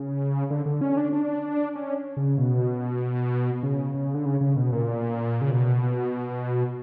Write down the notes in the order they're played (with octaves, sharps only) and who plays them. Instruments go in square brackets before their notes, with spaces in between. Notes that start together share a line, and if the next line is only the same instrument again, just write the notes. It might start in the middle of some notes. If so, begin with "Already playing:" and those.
Already playing: [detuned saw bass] C#3
D3
D3
C#4
D4
D4
C#4
C#3
B2
C#3
C#3
D3
C#3
C#3
B2
A#2
C#3
B2